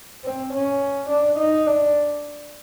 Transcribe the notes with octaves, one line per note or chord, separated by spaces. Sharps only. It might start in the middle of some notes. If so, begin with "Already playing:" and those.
C4
C#4
D4
D#4
D4